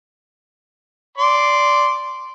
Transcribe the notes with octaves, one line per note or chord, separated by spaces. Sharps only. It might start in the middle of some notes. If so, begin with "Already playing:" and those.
D5 C6